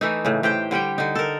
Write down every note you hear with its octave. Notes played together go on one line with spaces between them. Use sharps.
E3 A3 D#4
A2 C#3
A2 G4 C5 G5
D3 G3 G4 G5
D3 D#4
A4 A#4